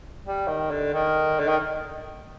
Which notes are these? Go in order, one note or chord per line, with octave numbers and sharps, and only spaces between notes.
G3
D#3
D3
D#3
D3
D#3